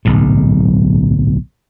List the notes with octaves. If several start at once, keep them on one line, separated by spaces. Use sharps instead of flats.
D1 B1 G#2